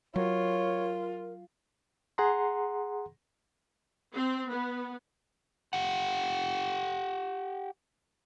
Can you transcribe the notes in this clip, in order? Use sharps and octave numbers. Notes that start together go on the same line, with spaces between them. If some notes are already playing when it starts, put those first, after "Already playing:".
F#3 F4 A#4 C#5
G#4 F#5 A#5 C6
C4
B3
G4 F#5